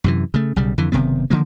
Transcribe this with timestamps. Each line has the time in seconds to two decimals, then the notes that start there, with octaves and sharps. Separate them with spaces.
0.04 F#2 C3 E3
0.34 C#3 A3
0.56 B1 C#3 G3
0.78 F2 D3 E3
0.92 F#1 C3 D#3 B3
1.30 D3 D#3 F3 A#3